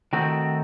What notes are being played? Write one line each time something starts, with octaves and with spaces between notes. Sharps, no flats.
D#3 A3 C4 F#4